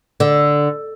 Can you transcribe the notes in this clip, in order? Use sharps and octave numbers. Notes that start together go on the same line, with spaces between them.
D3